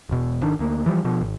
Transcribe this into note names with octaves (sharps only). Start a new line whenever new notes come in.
E1 B2
G#1 D#3 D4
D2 A#3
E3 F3 G3
B2 F3
G#1